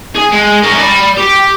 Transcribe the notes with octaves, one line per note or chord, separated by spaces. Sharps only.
G#4
G#3
C#4 A#4
D5 B5
G4